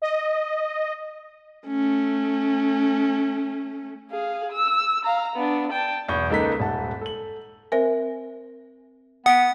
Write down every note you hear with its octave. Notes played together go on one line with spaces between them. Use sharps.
D#5
A3 C#4
G#4 F5
E6
F5 A#5
B3 D4
G5 A5
B1 E2 C#6 G6
C#2 A#3 D#4 A4 B4 B6
D#1 G#2 F#5 A5
A4 F#7
C4 A#4 C5 E5 G#5
B3 F#5 D#6 B6 D7